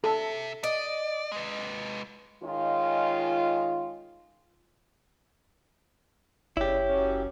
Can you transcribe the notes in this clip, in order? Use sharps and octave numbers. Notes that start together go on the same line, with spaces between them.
C3 A4 E5
D5 D#5
G#3 B4
D#3 G#3 C#4 F4
F#1 C#3 E4 G4 C#5 D5
F#2 C#4